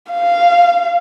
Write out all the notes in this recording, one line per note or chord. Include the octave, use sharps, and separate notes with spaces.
F5